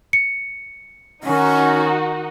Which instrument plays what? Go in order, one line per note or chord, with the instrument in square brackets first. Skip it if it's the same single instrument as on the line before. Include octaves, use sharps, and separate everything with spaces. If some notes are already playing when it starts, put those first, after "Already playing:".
[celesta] C#7
[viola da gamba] D#3 [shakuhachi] C#4 [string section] D#4 F#4